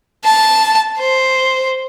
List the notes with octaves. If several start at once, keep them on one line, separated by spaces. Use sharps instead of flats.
A5
C5